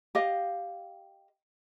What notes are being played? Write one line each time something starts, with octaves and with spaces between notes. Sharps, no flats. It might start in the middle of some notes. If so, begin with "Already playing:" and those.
G4 D#5 F5